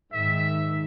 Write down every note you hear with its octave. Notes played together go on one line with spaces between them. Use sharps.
G#2 D#3 E5